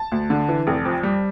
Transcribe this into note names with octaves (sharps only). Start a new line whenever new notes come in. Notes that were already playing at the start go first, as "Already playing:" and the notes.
Already playing: A5
D2
D3
E3
F1
F2
G3